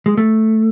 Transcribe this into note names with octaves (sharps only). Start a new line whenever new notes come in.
G#3
A3